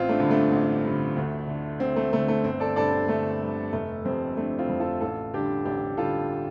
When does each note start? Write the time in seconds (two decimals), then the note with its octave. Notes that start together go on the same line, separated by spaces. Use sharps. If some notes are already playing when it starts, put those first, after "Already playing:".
Already playing: A1 C4 F4
0.09 A3 D4
0.20 G2 D3
0.30 A3 D4
0.52 A1
0.84 G2 D3
1.16 D2
1.47 D3
1.80 D2 C4
1.96 A3
2.13 D3 A3
2.28 A3
2.44 G1 C4
2.60 A4 D5
2.76 G2 D3 A4 D5
2.93 C4
3.08 G1 A3
3.41 G2 D3
3.73 F1 A3
4.05 F2 C3 C4
4.37 F1 A3 D4
4.59 C4 F4
4.69 F2 C3
4.80 F4 A4
5.01 A1 F4 A4
5.33 G2 D3 D4 G4
5.65 A1 D4 G4
5.97 G2 D3 F4 A4